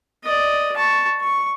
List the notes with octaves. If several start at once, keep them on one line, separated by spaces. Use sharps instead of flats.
D5 D#5
A5 C#6
C#6